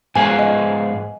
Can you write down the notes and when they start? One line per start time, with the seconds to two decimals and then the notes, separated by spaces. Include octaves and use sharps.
0.16 G#2 F3 B3 F4 G#4 G#5
0.39 D#5